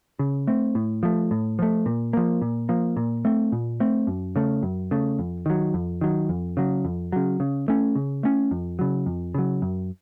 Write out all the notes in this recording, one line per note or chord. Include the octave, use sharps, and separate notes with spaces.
C#3
A3 C4
A2
F3 A3
A2
F3 A3
A#2
F3 A#3
A#2
F3 A#3
A#2
A3 C4
A#2
A3 C4
F#2
C#3 A3
F#2
C#3 A3
F2
D#3 F#3
F2
D#3 F#3
F2
C#3 F#3
F2
C#3 F#3
C#3
A3 C#4
C#3
A3 C#4
F2
C#3 F#3
F2
C#3 F#3
F#2